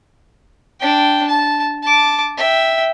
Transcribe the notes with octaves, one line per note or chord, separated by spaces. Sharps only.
D4 G5
A5
A5 D6
E5 G5